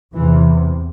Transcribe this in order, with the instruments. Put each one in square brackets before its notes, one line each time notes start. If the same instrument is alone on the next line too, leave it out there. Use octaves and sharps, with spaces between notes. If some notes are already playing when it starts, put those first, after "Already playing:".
[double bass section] E2 C3 E3